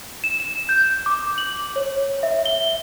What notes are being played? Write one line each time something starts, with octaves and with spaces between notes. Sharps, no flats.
E7
E7
G6
D6
F#7
C#5
E5
G7